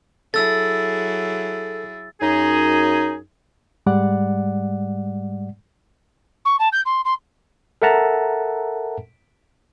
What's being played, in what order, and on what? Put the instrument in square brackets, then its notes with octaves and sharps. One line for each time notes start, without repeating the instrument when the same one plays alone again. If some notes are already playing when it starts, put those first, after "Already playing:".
[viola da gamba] F#3 E4 G#4 [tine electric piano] A4 [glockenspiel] E6 A6
[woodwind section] F#2 D#4 G#4
[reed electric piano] G#2 G3 G#3 D5 F#5
[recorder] C#6
A5
G6
C6
C6
[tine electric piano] A4 A#4 E5 F#5 A5 A#5